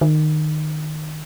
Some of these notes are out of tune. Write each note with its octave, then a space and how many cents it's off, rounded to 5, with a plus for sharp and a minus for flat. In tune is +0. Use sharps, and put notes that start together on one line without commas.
D#3 -20